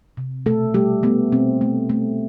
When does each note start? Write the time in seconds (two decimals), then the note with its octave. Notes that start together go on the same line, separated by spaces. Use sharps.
0.17 C3
0.46 B2 A3 A4
0.74 G3 A3 G4
1.03 A3 B3
1.32 B2 C4
1.61 A3
1.90 A3